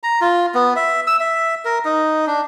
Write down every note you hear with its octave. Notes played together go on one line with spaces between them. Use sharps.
A#5
F4
B3
E5
E6
E5
A#4
D#4
D4